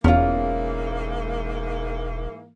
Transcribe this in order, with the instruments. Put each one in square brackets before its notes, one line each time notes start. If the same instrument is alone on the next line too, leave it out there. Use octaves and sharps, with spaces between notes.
[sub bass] E1 [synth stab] E2 [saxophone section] G#2 E3 A#3 [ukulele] C#4 F4